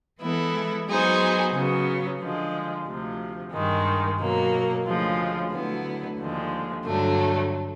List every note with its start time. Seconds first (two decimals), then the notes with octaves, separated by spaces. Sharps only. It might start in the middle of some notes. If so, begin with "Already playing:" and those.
0.20 E3 G#3 B3 E4 A4
0.87 F#3 B3 D#4 G#4 C5
1.53 C#3 F#3 B3
2.20 D3 F3 G#3
2.86 D2 C3 F3
3.52 G2 D#3 G#3
4.19 B2 F#3 A#3
4.86 D2 C#3 F3 G#3
5.52 D2 D3 F#3 B3 E4
6.18 D#2 D3 F3 G#3
6.85 G2 D3 F#3 A3 D4